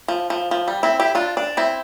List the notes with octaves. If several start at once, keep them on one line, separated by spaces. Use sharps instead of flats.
F3
F3
F3
G3
C4 E4
E4 G4
D4 F4
D4
C4 E4